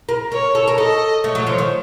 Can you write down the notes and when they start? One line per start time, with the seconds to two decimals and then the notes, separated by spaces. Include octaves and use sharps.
0.09 A#4
0.32 A#4 C#5
0.55 A4
0.68 A#4
0.78 A4 D#5
1.23 A3 C#5
1.35 F#3
1.47 F3
1.58 D#3